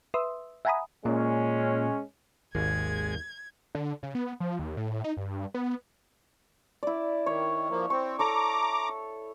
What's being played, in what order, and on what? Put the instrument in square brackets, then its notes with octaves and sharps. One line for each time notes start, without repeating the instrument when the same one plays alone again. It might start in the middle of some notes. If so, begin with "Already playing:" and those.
[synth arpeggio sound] B4 E5 C6 D#6 E6
E5 F#5 G#5 A#5 B5 D#6
[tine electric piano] A#2 [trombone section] G#3 C#4
[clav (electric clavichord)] G#1 [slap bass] D#2 [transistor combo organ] G#3 [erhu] G#6
[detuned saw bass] D3
C#3
B3
F3
D#2
A2
D#4
G2
B3
[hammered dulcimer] E4 D5
[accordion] D#3 [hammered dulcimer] C#5
[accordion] F3 A#3
[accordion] C4 [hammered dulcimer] C#6
[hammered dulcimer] A4 C#5 C#6 [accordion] A#5 D6